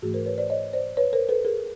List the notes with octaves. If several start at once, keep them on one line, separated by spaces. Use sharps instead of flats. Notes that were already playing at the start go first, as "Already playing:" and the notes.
G#2 E3 A3 F#4 G#4
A#4 C5
B4 C#5
C5 D5
C#5 D#5
C5 D5
B4 C#5
A#4 C5
A4 B4
G#4 A#4